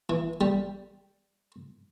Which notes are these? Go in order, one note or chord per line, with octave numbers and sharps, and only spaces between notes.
E3
G3